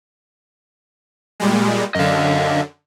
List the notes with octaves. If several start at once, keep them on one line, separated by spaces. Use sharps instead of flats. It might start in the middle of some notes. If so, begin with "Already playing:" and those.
A#2 G3 G#3
F#2 D3 D#5 F5